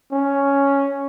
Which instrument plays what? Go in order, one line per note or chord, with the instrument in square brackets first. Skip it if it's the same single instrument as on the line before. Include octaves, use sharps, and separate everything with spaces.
[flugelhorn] C#4